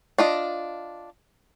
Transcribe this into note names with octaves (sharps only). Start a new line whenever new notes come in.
D4 F4 D#5